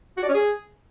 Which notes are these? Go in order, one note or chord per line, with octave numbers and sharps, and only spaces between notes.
F#4
D5
C#4
G#4